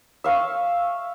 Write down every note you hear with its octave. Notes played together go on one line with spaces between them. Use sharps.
E5 F5 C#6 E6